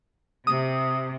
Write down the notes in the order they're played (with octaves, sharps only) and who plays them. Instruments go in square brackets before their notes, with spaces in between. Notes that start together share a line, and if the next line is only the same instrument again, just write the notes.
[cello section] C3 [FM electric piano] D#6